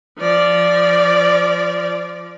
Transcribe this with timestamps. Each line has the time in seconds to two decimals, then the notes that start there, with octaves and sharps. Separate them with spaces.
0.19 F3 D5